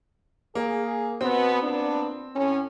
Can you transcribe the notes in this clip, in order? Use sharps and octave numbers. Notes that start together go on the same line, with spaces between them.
A#3 G#4
B2 B3 C4
A#2 B3 D4
A2 C#4